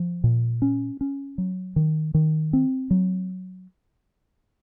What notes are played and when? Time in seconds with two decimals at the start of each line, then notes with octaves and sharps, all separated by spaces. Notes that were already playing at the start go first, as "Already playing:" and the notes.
Already playing: F3
0.24 A#2
0.62 C#4
1.01 C#4
1.38 F#3
1.76 D#3
2.14 D#3
2.53 C4
2.91 F#3